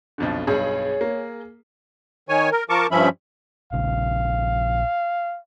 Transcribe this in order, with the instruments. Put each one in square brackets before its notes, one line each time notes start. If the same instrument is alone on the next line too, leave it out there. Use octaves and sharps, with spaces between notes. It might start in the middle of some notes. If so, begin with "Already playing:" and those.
[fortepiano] B1 F2 D3
[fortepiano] B1 G2 [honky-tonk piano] G#4 [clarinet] C#5
[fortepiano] A#3
[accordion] D#3 C#5 G#5
A#4
F3 A#4 A5 C#6 D6
G2 F3 C#4 E5 B5
[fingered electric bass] A#1 C#3 [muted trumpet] F5